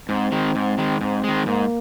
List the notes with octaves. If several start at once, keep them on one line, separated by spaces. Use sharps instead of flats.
G#2 C4
D#3 G#3
G#2
D#3 G#3
G#2 C4
D#3 G#3
G#2 A#3